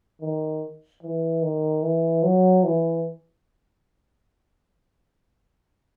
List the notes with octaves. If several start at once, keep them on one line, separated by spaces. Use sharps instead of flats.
D#3
E3
D#3
E3
F#3
E3